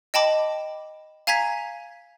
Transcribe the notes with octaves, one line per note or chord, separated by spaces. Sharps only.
D#5 G5 A5 B5 D6
F5 G#5 A#5 G#6 B6